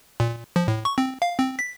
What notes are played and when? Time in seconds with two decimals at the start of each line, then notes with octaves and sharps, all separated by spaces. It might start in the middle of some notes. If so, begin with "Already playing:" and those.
0.20 A#2
0.56 F3
0.68 A2
0.85 C#6
0.98 C4
1.22 F5
1.39 C4
1.59 B6